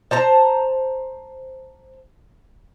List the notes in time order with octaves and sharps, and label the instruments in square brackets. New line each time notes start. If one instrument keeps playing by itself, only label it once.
[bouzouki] C5 A5 A#5